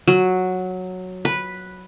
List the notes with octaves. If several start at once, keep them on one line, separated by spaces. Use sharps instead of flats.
F#3
B4